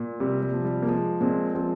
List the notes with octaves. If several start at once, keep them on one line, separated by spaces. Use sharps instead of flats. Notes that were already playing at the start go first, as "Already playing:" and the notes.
Already playing: A#2
C3 G3
G3
F3
G3
A#3
F3 G#3
A#2 G#3 C4
F3 G#3 C4